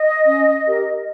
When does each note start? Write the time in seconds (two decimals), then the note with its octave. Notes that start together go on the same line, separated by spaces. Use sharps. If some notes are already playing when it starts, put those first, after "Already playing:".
Already playing: D#5
0.25 C#4
0.65 G4 A#4